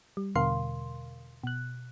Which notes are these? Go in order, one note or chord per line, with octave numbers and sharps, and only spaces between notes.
G3
E2 B2 D3 A#4 F5 C6
B2 F#6